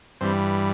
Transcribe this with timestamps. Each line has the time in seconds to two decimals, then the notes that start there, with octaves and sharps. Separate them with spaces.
0.21 G2 E3 G3 C4